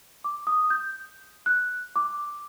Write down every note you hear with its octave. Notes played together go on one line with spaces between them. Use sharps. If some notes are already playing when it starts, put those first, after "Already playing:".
D6
D#6
G6
F#6
D6